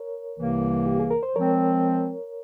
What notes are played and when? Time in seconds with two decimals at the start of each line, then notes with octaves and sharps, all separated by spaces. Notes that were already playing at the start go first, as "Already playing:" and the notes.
Already playing: A#4 C#5
0.38 C2 C3 E3 A#3
0.86 G4
1.00 G#4
1.11 A#4
1.23 C5
1.35 F3 G#3 C4 A#4 C#5